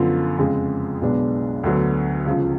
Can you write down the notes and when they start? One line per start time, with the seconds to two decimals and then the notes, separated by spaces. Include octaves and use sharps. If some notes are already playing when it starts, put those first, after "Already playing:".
Already playing: F#2 D3 F3 B3 F4
0.39 F2 C#3 G#3
1.02 B1 B2 G#3 B3 D4
1.64 D2 D3 F#3 B3
2.26 C#2 C#3 F3